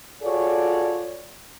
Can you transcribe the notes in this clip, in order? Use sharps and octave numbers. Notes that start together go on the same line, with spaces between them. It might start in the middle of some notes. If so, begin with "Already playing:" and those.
F4 F#4 G#4 A4 C#5 D5